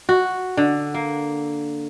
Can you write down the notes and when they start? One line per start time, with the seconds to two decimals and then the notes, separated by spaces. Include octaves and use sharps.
0.09 F#4
0.57 D3
0.94 A#3